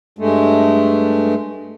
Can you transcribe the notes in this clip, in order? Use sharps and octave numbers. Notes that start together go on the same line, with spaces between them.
G2 G#3 A3